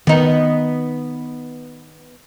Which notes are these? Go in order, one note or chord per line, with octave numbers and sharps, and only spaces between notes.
D#3 B3 D#4